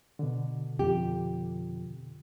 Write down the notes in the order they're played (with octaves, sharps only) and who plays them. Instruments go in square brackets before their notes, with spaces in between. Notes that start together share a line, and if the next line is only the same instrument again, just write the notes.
[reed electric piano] B2 D3
[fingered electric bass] F2 [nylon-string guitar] G4